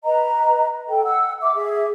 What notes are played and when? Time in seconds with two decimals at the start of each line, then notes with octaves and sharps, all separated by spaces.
0.04 B4 D#5 A#5
0.88 A4 G5
1.04 F#5 E6
1.42 E5 F#5 D6
1.54 G#4 E5